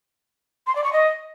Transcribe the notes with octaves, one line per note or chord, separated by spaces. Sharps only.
C6
D5
C#6
D#5